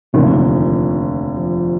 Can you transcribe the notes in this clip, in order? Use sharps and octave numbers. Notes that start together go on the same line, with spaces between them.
F1 D#2 D3 F3
F3